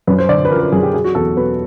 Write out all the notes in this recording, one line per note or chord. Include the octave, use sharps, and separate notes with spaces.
F#2 B4
C5
D3 D5
B4
F3 A#4
A#4
F#2 G#4
G4
F#3 G#4
F#4
E2 A4
B2 B4